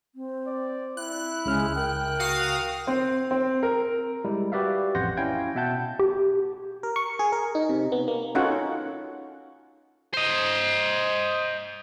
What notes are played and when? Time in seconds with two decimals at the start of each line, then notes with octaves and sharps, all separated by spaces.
0.15 C4
0.47 D5
0.97 E4 F#6
1.46 C#2 C#3 G#3 F6
1.76 A#4 G5
2.19 F#4 F5 D#6
2.87 C4
3.31 C4
3.63 A#4
4.25 G3 G#3 E4
4.52 F#4 G4 B4 D5 E5 F5
4.95 A1 F2 F#5 C6 G6 A#6
5.17 C#4 E4 F5 G5 G#6
5.55 B2 E5 F#5 A5 G6
5.99 G4
6.83 A#4
6.96 C#6
7.19 G#4
7.32 A#4
7.55 D#4
7.69 C3
7.92 B3
8.08 A#3
8.35 C#4 D#4 F4 F#4 A4 F#5
10.14 C5 D#5